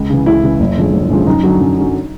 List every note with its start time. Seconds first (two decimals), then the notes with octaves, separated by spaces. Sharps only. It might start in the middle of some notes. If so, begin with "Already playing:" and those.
Already playing: C#2
0.10 C#3 E3
0.26 C#2 E4
0.43 C#3 E3
0.60 F#1
0.77 F#2 D3 F3 G#3
0.94 F#1
1.10 F#2 D3 F3 G#3
1.27 F#2 D#4
1.43 D3 F#3
1.61 F#2
1.77 D3 F#3